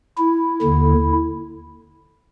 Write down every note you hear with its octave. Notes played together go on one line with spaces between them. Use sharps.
E4
D#2 D3